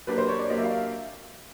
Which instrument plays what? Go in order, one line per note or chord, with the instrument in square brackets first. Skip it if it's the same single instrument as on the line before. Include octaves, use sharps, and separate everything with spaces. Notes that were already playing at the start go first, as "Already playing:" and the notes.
[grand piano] F#3 A#3 D4 G4 [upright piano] B4
[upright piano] C5
C#5
D5
[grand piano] F#3 A#3 D4 G4 [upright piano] D#5
[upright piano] E5
F5
E5